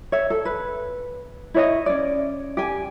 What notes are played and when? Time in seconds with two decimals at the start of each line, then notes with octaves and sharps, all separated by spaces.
0.12 C#5 E5
0.30 A4
0.45 B4
1.54 E4 C#5 D#5
1.86 C#4 D5
2.57 G4 G#5